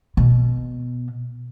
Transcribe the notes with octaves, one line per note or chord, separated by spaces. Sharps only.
B2